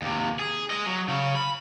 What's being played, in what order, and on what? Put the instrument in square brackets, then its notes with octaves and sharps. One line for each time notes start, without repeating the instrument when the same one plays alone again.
[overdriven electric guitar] D#2 C3
G#4
G#3 D#5
F#3
C#3 C#4
B5